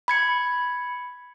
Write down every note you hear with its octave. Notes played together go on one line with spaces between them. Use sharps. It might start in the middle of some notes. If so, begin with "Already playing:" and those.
B5 G#6 C#7